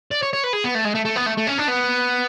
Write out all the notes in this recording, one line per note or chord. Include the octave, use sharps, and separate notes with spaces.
D5
C#5
C#5
B4
G#4
B3
A3
G#3
A3
A3
B3
A3
A3
C#4
D4
B3